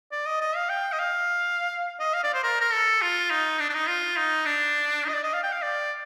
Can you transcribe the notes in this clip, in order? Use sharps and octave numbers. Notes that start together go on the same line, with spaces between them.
D5
D#5
D#5
F5
G5
D#5
F5
D#5
F5
D5
C5
A#4
A#4
A4
F4
D#4
D4
D4
D#4
F4
D#4
D4
D#4
D#5
D5
D#5
F5
G5
F5
D5